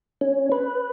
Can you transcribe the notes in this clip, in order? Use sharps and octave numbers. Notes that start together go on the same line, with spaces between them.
C#4
B4